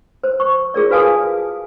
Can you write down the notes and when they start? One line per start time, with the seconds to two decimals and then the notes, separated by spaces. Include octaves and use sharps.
0.24 C5
0.40 C#6
0.74 F4 G#4 A#4 D5
0.91 F#4 B4 F5 G#5 A5 D#6